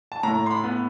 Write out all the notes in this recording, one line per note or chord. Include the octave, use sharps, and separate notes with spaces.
A5
A2 A#5
C6
B5
B3